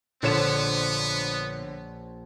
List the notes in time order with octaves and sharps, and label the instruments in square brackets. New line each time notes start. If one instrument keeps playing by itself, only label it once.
[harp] A#1 C5 [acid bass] A#2 [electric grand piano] D3 C#5 E7 [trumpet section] B3